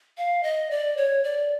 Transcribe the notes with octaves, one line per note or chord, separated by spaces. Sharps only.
F5
D#5
D5
C#5
D5